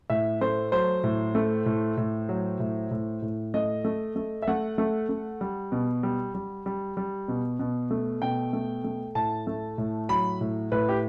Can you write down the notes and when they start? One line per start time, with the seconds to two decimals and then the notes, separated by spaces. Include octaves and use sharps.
0.10 A2 E5
0.41 A3 C5
0.72 F#3 C5
1.04 A2
1.35 A3
1.66 A2
1.97 A2
2.29 F#3
2.60 A2
2.91 A2
3.22 A2
3.54 A3 D#5
3.84 A3
4.16 A3
4.42 E5
4.47 A3 F#5
4.78 A3
5.09 A3
5.41 G3
5.72 B2
6.03 G3
6.35 G3
6.66 G3
6.97 G3
7.28 B2
7.59 B2
7.91 A3
8.22 B2 G5
8.53 A3
8.84 A3
9.15 A2 A5
9.47 A3
9.78 A2
10.09 F#3 B5
10.41 A2
10.72 A2 B4
10.89 G4